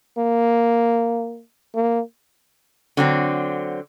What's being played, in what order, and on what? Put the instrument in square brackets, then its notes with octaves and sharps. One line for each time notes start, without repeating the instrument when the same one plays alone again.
[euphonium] A#3
A#3
[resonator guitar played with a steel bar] D3 F#3 C4